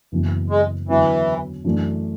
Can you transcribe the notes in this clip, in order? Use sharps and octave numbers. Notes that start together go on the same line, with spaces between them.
F#1 F#2 E3 B3
G#3
E2 D3 E3 F#3 C#4
F#2 E3 A3 D4